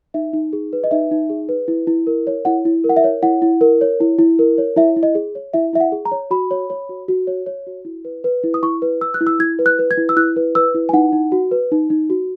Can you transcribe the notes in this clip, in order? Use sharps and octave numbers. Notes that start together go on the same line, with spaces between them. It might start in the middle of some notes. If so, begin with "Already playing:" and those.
D#4 E5
D#4
G#4
B4
D#5
D#4 E5
D#4
G#4
B4
E4
E4
A#4
C#5
E4 F#5
E4
A#4
F#5
E5
C#5
E4 F#5
E4
A#4
C#5
E4
E4
A#4
C#5
E4 E5
E4
D#5
G#4
C#5
E4 E5
E4 E5
F#5
G#4
A#5
C#5
F#4 B5
C#5
C#5
F#4
F#4
C#5
C#5
F#4
E4
B4
B4
E4
D#6
E4 C#6
B4
B4 E6
F#6
E4
E6
E4 G#6
B4
F#6
B4
G#6
E4
E6
E4 F#6
B4
B4 E6
E4
G#5
D#4 F#5
D#4
F#4
B4
D#4
D#4
F#4